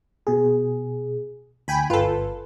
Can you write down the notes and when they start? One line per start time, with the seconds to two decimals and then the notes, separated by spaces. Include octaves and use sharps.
0.27 B2 G#4
1.68 D2 G5 G#5 B5
1.90 G1 F4 A4 B4